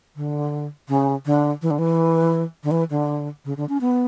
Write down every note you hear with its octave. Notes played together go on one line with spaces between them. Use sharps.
D3
C#3
D3
E3
D3
E3
D3
E3
D3
C#3
D3
C#4
B3